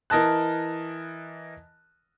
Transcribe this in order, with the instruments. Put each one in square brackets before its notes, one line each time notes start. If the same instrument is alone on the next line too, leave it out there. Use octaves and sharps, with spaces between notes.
[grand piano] E3 A#4 D#5 A5 F#6